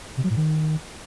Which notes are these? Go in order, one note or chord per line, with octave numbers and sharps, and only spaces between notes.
C3
F#3
A2
D#3